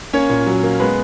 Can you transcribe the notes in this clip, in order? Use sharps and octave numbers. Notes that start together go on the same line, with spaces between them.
A#3 C#4 C#5
A#2
F#3
A#3
G#3 B3 B4